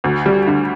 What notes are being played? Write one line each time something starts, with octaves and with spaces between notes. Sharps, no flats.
D2
G3
D3